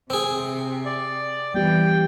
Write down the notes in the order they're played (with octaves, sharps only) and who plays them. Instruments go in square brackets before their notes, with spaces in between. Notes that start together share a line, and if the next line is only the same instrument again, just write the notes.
[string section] C3 [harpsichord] C4 G#4
[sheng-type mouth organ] D5
[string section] E3 [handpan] G3 B3 G4 [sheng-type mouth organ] G5